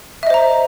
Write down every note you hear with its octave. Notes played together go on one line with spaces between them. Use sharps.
C5 D#5 E5 A#5